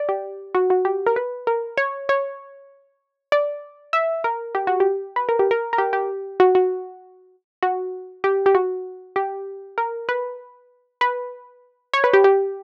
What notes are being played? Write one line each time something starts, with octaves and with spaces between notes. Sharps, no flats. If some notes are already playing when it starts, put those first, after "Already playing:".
Already playing: D5
G4
F#4
F#4
G4
A#4
B4
A#4
C#5
C#5
D5
E5
A#4
G4
F#4
G4
B4
A#4
G4
A#4
A#4
G4
G4
F#4
F#4
F#4
G4
G4
F#4
G4
A#4
B4
B4
C#5
B4
G4
G4